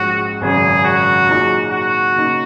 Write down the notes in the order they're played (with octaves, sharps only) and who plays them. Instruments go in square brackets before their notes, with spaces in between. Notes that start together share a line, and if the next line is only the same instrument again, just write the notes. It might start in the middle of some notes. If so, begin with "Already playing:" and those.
Already playing: [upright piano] A#1 G#2 G#3 C#4 [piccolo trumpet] F#4
[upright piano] G#1 F#2 C#3 [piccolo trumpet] G#4
[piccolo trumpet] F#4
[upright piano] A#2 F#3 D#4 G#4
[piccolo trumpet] F#4
[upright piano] C#3 A#3 D#4